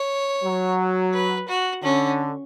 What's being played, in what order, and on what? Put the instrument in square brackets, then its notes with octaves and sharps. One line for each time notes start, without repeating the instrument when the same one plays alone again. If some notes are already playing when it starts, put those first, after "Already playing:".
Already playing: [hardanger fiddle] C#5
[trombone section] F#3
[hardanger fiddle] B4
F#4
[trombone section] D3 [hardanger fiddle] C#4